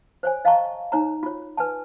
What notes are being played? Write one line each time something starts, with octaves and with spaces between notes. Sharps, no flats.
C5 C#5 G#5
D#5 F5 G5 A5 A#5 C#6
D#4 C#5 A#5
F4 C#5
B4 G#5 A5